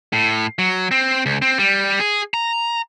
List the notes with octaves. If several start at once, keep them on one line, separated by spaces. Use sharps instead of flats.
A2
F#3
C4
C#2
C4
G3
G#4
A#5